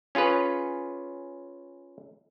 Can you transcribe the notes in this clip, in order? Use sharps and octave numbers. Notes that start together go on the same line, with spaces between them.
C#4 F4 G#4 B4 C#5